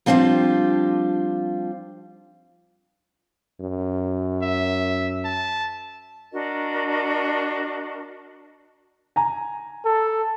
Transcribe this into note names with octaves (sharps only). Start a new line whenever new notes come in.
F3 G3 C4 D4 F4 G4
F#2
E5
A5
D4 F#4 A#4 D#5
G#5 A#5
A4